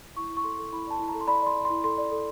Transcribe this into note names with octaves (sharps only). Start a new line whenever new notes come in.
E4 C#6
E4
C#6
A4 C6
A4
E4 B5
D5 A5
E4
A#5
A4
C6
D5 B5
D5 C6
D5
C6
E4
A4 C6
D5
A4